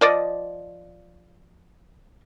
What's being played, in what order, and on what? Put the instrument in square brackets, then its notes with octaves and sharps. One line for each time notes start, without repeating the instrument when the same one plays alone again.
[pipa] F3 D5 D#5